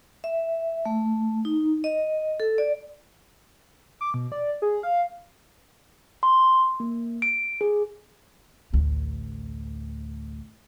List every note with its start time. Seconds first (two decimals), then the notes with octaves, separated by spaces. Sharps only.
0.24 E5
0.85 A3
1.45 D#4
1.84 D#5
2.40 A4
2.58 D5
4.01 D6
4.14 B2
4.32 D5
4.62 G#4
4.83 F5
6.23 C6
6.80 A#3
7.22 D7
7.61 G#4
8.73 A1 D2